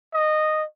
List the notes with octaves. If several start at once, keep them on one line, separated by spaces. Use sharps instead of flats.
D#5